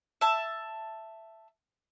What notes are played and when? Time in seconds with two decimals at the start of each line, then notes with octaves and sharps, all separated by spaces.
0.21 E5 A5